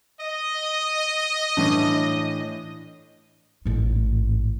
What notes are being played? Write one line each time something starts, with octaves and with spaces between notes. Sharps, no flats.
D#5
A2 E3 D4
A1 G#2